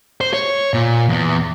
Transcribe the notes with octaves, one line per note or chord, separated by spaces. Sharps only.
C5
C#5
A#2
E2